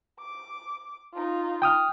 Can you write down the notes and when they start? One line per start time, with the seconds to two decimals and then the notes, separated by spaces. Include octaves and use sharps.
0.20 D6
1.13 D#4 F4
1.62 G5 D#6 F6